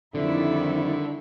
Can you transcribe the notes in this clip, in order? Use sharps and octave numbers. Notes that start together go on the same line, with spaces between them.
F2 D3 D#3 G3 E4